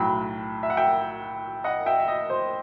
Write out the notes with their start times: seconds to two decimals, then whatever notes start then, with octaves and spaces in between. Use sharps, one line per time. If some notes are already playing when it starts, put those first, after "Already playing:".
Already playing: B1 A2 F#3 G5 B5
0.63 E5
0.70 F#5
0.77 E5 G5
1.64 D#5 F#5
1.86 E5 G5
2.00 E5
2.08 D#5
2.30 C5